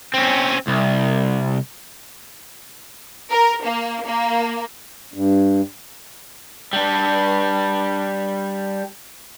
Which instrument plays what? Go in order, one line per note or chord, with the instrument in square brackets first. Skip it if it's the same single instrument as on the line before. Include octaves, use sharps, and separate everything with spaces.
[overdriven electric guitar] C4 C#4
C2
[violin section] A#4
A#3
A#3
[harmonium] G2
[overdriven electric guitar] G3 D4